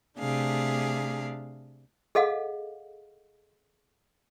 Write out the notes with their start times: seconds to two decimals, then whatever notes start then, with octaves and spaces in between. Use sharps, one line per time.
0.18 C3 A3 D4 G#4 F5
2.15 G#4 A4 D#5 F5 F#5